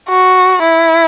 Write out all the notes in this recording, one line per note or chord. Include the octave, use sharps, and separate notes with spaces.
F#4
E4